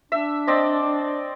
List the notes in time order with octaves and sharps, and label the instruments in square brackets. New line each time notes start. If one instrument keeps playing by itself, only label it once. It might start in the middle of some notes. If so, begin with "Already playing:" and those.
[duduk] D4 [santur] E5
[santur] C4 D5 D#5